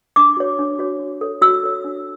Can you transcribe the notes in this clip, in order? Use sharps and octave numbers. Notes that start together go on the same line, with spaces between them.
D4 D6
F#4 C#5
D4
F#4 C#5
F#4
A4 C#5
F#4 E6
A4 C#5
D4